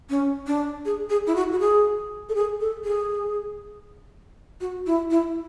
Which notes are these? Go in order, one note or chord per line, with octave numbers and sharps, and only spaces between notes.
C#4
D4
G#4
G#4
E4
F#4
F#4
G#4
A4
G#4
A4
G#4
F#4
E4
E4